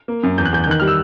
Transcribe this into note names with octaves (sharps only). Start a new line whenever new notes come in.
A#3
F#2
E2 G6
F#6
E2 G6
G6
D#3 F#6
G3 F6
E6